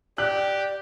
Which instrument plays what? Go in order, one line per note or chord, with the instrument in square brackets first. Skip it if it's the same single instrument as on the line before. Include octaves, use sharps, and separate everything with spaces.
[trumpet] G4 [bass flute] D5 [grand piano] F#6